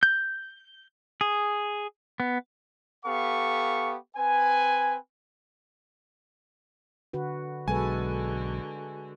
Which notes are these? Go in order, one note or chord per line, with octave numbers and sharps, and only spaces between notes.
G6
G#4
B3
B3 G4 A4 F5 C#6
C4 B4 G#5
D3 F#4 B4
B1 D3 G#3 F#4 A4 B4 G#5